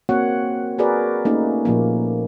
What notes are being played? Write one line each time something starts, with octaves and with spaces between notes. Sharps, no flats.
A#3 C4 F#4 C#5 F#5
F#4 G#4 A#4 B4 D5
A3 A#3 C#4 D#4
A#2 F3 A#3